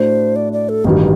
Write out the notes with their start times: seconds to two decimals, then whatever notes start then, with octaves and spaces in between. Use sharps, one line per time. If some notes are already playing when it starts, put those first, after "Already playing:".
Already playing: A2 A3 D4 F#4 C5
0.36 D5
0.53 D5
0.69 A4
0.84 A1 G2 D#3 F#3 G4